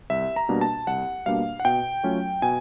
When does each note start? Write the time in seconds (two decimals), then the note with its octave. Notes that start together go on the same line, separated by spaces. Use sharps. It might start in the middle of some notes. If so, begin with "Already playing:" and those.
0.10 C2 E5
0.36 A#5
0.49 B2 G3 A#3 D4
0.61 A5
0.87 C2 F#5
1.26 B2 G3 A#3 D4 F5
1.60 F#5
1.65 B2 G5
2.03 F#3 A3 C#4 F4
2.42 B2 G#5